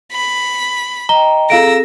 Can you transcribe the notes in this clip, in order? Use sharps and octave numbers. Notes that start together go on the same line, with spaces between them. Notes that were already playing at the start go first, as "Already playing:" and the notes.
B5
D#5 G5 A#5 G7
C4 F4 G#4 A4 F5 E6 A#6 D7